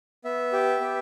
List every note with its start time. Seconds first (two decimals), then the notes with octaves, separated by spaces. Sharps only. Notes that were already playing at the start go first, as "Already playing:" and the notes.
0.24 B3 E5
0.53 G4
0.80 B3